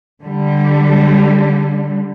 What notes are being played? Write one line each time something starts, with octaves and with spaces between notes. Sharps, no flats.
D3 G3